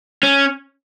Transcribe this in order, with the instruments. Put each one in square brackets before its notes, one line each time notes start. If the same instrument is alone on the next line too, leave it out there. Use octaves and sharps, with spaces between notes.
[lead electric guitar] C#4